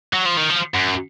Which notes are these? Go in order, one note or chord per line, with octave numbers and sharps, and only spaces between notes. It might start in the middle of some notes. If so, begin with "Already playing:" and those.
F#3
F3
D#3
F3
F#2